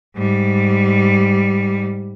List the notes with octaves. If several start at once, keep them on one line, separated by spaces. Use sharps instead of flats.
G#2 G3